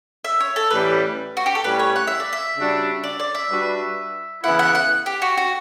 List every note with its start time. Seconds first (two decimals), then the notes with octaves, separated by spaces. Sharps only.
0.24 E5
0.40 C#5
0.56 A4
0.71 A2 E3 G3 C#4 B4
1.37 F#4
1.46 G4
1.55 A4
1.64 A2 G3 C#4 B4
1.79 C#5
1.96 F#5
2.07 E5
2.20 D5
2.33 E5
2.57 C#3 G3 D4 F#4
3.04 D5
3.20 D5
3.35 E5
3.50 G3 D4 F#4 B4
4.43 C#3 E3 B3 E4 F#5
4.59 F#5
4.75 F#5
5.06 G4
5.22 F#4
5.37 F#4